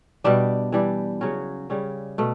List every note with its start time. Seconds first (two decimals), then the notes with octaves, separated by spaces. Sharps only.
0.24 B2 G3 D4 G4
0.72 E3 G3 D4 G4
1.21 C#3 F#3 C#4 F#4
1.70 C#3 G3 C#4
2.18 B2 A3